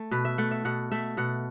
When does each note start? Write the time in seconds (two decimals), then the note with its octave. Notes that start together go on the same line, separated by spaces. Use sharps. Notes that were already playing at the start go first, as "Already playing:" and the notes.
Already playing: A3
0.11 B2 B4
0.25 E5
0.38 A3 F#5
0.51 E5
0.65 B2 F#5
0.92 A3 E5
1.17 B2 F#5